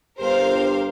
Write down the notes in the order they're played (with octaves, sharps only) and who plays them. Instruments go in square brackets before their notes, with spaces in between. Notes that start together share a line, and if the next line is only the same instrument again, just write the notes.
[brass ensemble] G1 G4 [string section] A#4 C5 F5